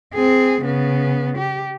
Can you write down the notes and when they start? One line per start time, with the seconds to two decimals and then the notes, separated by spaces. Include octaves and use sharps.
0.14 C4 G#4
0.61 C#3 B3
1.38 G4